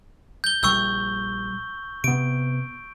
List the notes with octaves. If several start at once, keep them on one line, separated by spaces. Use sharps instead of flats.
G6 G7
A#1 G3 C#6 E6 G6
C3 B3 D7